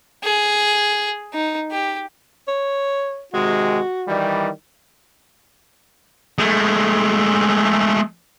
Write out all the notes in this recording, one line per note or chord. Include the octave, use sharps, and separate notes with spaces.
G#4
D#4
G4
C#5
C3 D#3 G#3 F#4
D#3 E3 G3
G#3 A3